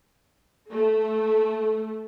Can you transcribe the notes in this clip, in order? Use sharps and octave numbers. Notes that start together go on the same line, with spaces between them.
A3